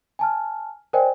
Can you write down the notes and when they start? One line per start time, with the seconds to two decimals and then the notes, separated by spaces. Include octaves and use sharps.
0.19 G#5 A5 F6
0.93 A#4 C5 D5 D#5 G5 G#5